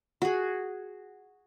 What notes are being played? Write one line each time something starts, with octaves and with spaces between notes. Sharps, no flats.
F#4 G#4